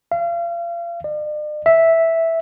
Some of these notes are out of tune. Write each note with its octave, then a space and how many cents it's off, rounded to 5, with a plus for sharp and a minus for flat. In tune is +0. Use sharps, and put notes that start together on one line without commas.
F5 -35
D5 +45
E5 -5